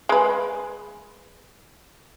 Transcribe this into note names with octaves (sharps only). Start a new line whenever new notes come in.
G#3 B4